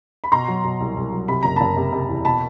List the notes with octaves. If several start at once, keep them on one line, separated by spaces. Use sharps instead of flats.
B5
B2 A#5 C6
F#3
B2
C2
C2
F#3
C3 B5
F#1 A#5
F#1 A5 B5
C3
C3
E2
B2 A5 B5